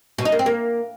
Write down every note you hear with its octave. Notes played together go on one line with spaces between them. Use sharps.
B2
D#4
A#3
C4
A#3